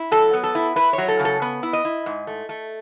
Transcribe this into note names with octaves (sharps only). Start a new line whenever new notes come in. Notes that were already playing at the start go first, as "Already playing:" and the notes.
Already playing: E4
F#3 A4
B3
A4
E4
E4 B4
C#5
F#3
A4
C#3
A4
B3
E4
D#5
E4
G#2
A3
A3